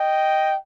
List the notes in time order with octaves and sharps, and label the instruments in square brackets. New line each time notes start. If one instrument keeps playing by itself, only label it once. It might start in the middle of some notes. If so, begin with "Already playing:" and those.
Already playing: [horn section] D#5 G5